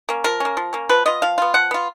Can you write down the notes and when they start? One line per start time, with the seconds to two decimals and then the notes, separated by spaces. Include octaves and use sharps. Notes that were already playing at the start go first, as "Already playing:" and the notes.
0.09 A#3 C#4
0.24 F3 A#4
0.40 A#3 C#4
0.57 F3
0.73 A#3 C#4
0.89 F3 B4
1.06 B3 F4 D#5
1.22 F3 F5
1.38 B3 F4
1.54 F3 F#5
1.71 B3 F4